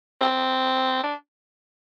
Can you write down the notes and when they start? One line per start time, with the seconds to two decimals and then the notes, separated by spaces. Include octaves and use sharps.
0.21 C4
1.03 D4